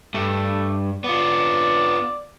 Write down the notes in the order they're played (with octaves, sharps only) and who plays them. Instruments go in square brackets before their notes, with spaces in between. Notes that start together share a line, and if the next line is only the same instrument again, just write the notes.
[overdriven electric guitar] G2 [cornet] A3
[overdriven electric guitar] B3 F4 [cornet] D5